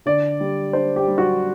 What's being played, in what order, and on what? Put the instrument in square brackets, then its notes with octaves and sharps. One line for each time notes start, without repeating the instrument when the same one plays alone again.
[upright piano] D3 D5
G3
D4 C5
G4
G3
F#4